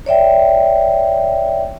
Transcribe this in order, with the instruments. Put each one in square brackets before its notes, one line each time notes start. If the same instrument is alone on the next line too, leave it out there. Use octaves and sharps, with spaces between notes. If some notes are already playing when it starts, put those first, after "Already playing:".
[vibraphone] C#5 D5 E5 G5